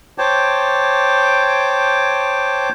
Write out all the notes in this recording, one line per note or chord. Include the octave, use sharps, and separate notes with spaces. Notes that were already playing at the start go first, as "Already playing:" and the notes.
C5 C#5 G5 A5 D6